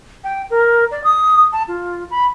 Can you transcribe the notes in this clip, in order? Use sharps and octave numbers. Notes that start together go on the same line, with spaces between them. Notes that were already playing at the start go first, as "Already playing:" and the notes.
G5
A#4
D5
D#6
A5
F4
B5